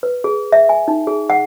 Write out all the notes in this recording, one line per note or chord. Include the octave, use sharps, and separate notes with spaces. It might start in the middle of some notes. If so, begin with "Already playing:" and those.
B4
G#4
E5
G#5
D#4
G#4
F#5